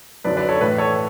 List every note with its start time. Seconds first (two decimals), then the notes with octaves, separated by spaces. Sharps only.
0.24 F#2 D3 F#3 B4 D5
0.37 B4 D5
0.49 A4 C#5
0.60 A2 E3 B4
0.78 A4 C#5